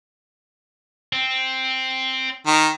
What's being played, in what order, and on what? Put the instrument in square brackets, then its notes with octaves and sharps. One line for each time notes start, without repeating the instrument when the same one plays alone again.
[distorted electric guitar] C4
[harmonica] D#3